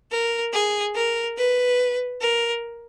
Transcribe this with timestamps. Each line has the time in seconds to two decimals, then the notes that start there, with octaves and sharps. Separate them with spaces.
0.11 A#4
0.52 G#4
0.95 A#4
1.37 B4
2.21 A#4